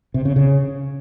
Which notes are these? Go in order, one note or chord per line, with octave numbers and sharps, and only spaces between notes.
C3
C#3
C#3